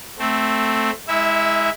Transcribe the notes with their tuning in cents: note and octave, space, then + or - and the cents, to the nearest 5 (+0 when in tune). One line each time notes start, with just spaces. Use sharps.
A3 +0 C4 +0
G#3 -10 E4 -25 E5 +0